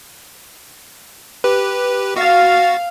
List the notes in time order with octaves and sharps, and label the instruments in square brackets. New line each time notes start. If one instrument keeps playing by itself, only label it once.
[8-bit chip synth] G4 B4
[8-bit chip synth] F#4 A6 [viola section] F5